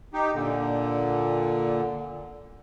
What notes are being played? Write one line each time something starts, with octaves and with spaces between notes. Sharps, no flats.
D#4 G4
A#2 D3